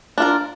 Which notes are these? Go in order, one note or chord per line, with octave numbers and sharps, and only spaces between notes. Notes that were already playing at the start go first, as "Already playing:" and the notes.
D4 F4 A#4